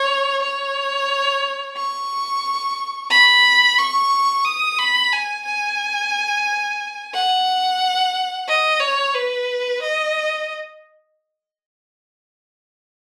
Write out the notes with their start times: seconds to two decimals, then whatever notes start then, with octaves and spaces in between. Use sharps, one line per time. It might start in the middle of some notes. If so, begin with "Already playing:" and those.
Already playing: C#5
0.43 C#5
1.77 C#6
3.11 B5
3.79 C#6
4.45 D#6
4.78 B5
5.13 G#5
5.45 G#5
7.14 F#5
8.48 D#5
8.81 C#5
9.15 B4
9.82 D#5